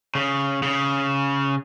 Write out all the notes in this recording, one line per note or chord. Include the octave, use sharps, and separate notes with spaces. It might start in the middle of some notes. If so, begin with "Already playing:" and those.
C#3
C#3